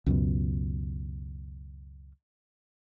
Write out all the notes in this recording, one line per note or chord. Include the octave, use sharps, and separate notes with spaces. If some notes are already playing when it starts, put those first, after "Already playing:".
C#2 F#2 B2